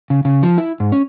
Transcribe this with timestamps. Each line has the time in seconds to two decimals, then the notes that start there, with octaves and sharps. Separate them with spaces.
0.10 C#3
0.25 C#3
0.43 F3
0.58 E4
0.80 G#2
0.92 C#4